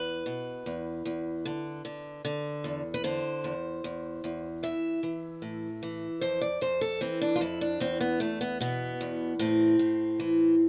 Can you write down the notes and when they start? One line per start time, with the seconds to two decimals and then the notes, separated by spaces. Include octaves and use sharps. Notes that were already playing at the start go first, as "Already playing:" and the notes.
Already playing: E2 B4
0.26 B2
0.66 E2
1.05 E2
1.45 D3
1.85 D3
2.25 D3
2.64 E2
2.94 B4
3.04 D3 C5
3.44 E2
3.84 E2
4.24 E2
4.63 E3 E5
5.03 E3
5.42 A2
5.83 E3
6.21 F2 C5
6.41 D5
6.61 F2 C5
6.81 A4
7.01 E3 C4
7.21 D4
7.36 F4
7.41 F2 E4
7.61 D4
7.80 E2 C4
8.00 B3
8.20 E2 A3
8.41 B3
8.60 B2 B3
9.01 E2
9.39 A2 C4
9.79 A2
10.19 E3